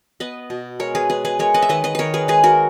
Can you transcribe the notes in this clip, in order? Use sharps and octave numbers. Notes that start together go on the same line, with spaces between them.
B3 B4 D#5
B2
G#3 A#4 C#5
G#4 B4
G#3 G#4 B4
G#4 B4
G#3 A#4 C#5
B4 D#5
E5
D#3 B4 D#5
B4 D#5
D#3 A#4 B4 C#5
G#4 B4
G#3 G#4 B4
F#4 A#4